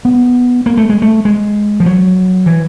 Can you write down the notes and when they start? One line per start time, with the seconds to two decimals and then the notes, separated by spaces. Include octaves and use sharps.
0.05 B3
0.66 A#3
0.77 A3
0.90 G#3
1.02 A3
1.25 G#3
1.80 F3
1.86 F#3
2.46 E3